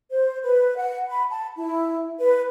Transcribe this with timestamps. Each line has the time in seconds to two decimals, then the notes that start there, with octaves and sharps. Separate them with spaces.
0.11 C5
0.42 B4
0.77 F#5
1.09 B5
1.30 A5
1.56 E4
2.19 B4